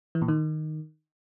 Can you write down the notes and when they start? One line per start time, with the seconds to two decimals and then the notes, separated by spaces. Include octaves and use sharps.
0.15 E3
0.22 A#2
0.28 D#3